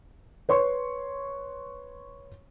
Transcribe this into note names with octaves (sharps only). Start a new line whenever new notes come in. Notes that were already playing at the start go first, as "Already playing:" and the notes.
B4 C#5 C6 C#6